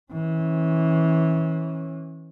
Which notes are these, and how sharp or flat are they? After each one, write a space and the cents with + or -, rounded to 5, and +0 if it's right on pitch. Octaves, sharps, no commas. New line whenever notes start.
E3 -25 C#4 -30